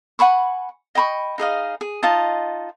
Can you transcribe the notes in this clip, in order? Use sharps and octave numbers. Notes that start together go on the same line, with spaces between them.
F#5 G#5 B5 C#6
D#5 G5 B5 C#6
D#4 G#4 D#5 F5
G#4
D#4 F4 D#5 A5